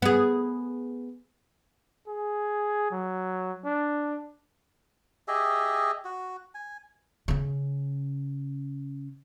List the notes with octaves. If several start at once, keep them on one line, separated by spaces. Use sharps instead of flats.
B3 G#4
G#4
F#3
D4
G4 G#4 D#5 E5
F#4
G#5
C#3 C#4